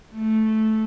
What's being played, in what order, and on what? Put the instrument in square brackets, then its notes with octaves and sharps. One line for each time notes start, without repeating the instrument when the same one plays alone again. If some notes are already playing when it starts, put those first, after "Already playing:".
[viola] A3